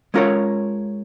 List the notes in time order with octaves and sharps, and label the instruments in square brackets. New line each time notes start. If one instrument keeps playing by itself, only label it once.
[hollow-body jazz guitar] G#3 C#4 F4 A#4 C#5